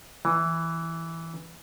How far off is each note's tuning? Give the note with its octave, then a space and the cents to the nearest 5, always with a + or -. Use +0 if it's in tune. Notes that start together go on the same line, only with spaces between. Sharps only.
E3 +0